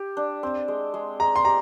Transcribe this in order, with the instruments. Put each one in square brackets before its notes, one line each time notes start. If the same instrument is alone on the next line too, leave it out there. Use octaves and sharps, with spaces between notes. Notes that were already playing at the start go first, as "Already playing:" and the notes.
Already playing: [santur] G4
D4
C4
G#3
G#3
[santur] G#3 [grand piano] A#5
[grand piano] C6
[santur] G4 [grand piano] A#5